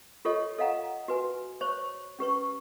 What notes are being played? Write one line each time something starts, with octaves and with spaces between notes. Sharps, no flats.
F4 G4 A4 C#5 D#5
A4 D#5 F5 F#5 A#5
F#4 B4 G#5
C5 C#5 C#6
C#4 G4 B4 C#6